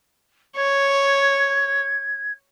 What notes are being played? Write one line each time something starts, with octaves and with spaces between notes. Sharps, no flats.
C#5 G#6